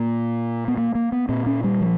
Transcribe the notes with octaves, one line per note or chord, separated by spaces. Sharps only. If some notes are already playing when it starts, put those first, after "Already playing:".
Already playing: A#2 A#3
B3
A#3
A#3
B3
A#2 C4
C#4
G3
F3